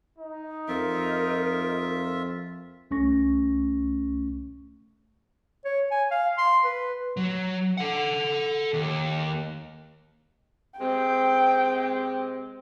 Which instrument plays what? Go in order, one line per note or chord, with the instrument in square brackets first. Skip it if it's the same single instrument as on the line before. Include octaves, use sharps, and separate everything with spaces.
[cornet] D#4
[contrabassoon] F2 [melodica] F4 E5 [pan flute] A#4
[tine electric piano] C2 A3 C#4 C#6 A#6
[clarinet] C#5
G#5
F5
C6
B4
[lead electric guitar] F#3
A4 F#5
D#2
[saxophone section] C3 G#3 C4 [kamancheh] G5